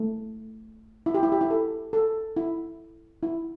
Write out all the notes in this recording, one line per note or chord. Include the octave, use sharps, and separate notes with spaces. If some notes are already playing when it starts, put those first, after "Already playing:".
Already playing: A3
E4
G4
E4
G4
E4
A4
A4
E4
E4